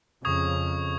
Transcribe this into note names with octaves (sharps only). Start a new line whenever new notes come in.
F2 C#3 C#6 D#6 G#6